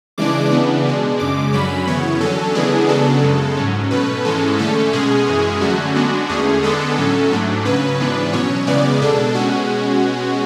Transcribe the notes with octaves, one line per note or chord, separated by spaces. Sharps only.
C#3 E3 G#3 D4 D6
C#3 E3 B3 D4
B2 G#3 D4
F#2 C#3 G#3 D6
F#2 D3 F#3 C#4 B5
F#2 C#3 E3 B3 C#5
D3 F#3 C#4 A4
C#3 E3 G#3 B3 D4 G#4
C#3 F#3 B3 D4 A4
F#2 C#3 G#3
G#2 F#3 C#4
B2 A3 C#4 B4
G#2 E3 G#3 C#4 A4
D3 A3 C#4 A4
B2 G#3 C#4 G#4
F#2 E3 G#3 C#4
D3 F#3 A3 C#4 F#4
D3 G#3 B3 D4 F#4
E2 D3 A3 C#4 G#4
D3 G#3 B3 D4 A4
A2 F#3 C#4
G#2 F#3 A3 D4
C#3 F#3 C#4 B4
G#2 E3 B3 D4
B2 F#3 C#4 C#5
E2 C#3 G#3 B3 D5
B2 G#3 D4 A4
B2 G#3 C#4 F#4